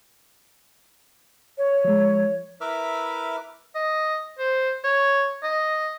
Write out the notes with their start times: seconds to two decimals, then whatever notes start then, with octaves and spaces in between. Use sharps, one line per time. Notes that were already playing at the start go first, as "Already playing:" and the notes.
1.57 C#5
1.85 F3 G#3
2.61 E4 A#4 B4 E5 D6 F6
3.75 D#5
4.39 C5
4.84 C#5
5.43 D#5